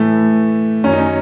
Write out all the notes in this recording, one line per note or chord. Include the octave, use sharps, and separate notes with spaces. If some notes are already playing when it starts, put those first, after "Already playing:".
Already playing: A2 E3 A3
F#2 D#3 C#4
D#4
C#4